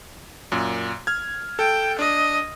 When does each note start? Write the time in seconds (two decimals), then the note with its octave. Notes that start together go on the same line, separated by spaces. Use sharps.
0.52 F#2 A#2
1.07 F6 G#6
1.59 A4 G5
1.99 D4 D#5